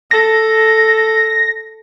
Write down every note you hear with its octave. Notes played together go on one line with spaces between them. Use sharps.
A4 A#6